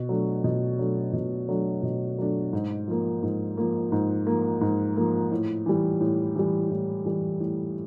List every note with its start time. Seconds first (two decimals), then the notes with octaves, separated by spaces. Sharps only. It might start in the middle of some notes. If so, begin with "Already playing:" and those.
Already playing: B2
0.09 F#3 A3 D4
0.44 B2
0.79 F#3 A3 D4
1.13 B2
1.49 F#3 A3 D4
1.83 B2
2.18 F#3 A3 D4
2.53 G#2
2.88 F3 A#3
3.23 G#2
3.57 F3 A#3
3.92 G#2
4.27 F3 A#3
4.61 G#2
4.97 F3 A#3
5.31 A2
5.66 E3 G3
6.00 A2
6.36 E3 G3
6.71 A2
7.05 E3 G3
7.40 A2